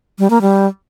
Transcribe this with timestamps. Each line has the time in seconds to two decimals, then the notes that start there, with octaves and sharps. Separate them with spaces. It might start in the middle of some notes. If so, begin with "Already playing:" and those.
0.19 G3
0.30 A#3
0.42 G3